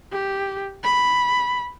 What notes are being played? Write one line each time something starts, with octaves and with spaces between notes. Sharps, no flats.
G4
B5